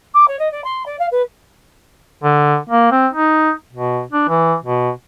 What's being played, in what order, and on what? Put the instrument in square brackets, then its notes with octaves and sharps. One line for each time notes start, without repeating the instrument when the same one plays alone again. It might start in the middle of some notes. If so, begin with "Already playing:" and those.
[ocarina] D6
C#5
D#5
D5
C6
D5
F5
B4
[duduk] D3
A#3
C4
D#4
B2
D4
E3
B2